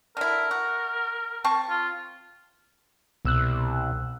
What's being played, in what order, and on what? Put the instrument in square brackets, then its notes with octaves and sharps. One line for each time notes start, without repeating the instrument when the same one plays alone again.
[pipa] D3 E4 [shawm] A#4
[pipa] F#4
C4 A5 C#6
[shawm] F4
[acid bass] C2 [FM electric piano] B2 E6 F#6